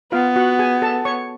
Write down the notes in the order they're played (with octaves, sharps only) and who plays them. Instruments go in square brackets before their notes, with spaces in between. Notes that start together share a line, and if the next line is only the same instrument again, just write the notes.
[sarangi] B3 [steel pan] F4 F5
[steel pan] F#4 F#5
G#4 G#5
A4 A5
C#5 C#6